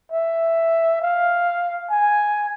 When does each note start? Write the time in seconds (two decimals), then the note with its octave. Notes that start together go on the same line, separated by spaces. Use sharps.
0.12 E5
1.02 F5
1.90 G#5